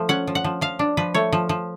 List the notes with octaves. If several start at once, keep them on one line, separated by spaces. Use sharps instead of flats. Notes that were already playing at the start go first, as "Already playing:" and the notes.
Already playing: F3 A3
C#4 F#5
F3
F#5
F3
F3 F5
D4
F3 B4
A3 C#5
F3
F3